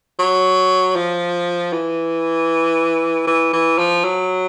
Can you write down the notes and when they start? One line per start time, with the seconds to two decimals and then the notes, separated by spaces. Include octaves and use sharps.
0.19 F#3
0.96 F3
1.73 E3
3.27 E3
3.53 E3
3.78 F3
4.04 F#3